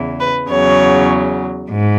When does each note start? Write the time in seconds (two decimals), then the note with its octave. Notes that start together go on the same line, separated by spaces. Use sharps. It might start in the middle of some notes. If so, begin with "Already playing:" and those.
Already playing: E2 C#3 E3
0.20 B4
0.50 E2 C#3 F#3 C#5
1.69 G#2